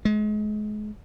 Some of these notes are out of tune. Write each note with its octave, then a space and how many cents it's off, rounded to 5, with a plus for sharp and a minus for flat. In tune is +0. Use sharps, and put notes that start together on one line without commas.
G#3 +30